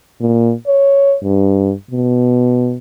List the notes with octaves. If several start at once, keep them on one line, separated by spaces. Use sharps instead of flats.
A#2
C#5
G2
B2